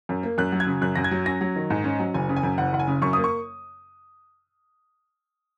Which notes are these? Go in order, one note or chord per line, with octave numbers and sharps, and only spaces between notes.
F#2
A#3
F#2 F#6
F#3
G#6
C#3
F#2 F#6
F#2 A#6
G#6
F#3
C#4 A#6
F#3
D#3
G#2
C#4
F#3
F#1 G#5
C#3
G#5
F#2
F#1 F#5
F#1 F#5
G#5
C#3
F#2 C#6
A#3 D#6
C#6